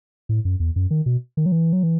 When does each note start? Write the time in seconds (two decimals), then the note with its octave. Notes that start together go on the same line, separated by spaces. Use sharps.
0.29 A2
0.45 F#2
0.60 E2
0.76 F#2
0.91 D#3
1.06 B2
1.37 D#3
1.46 F#3
1.52 E3
1.73 F#3
1.83 E3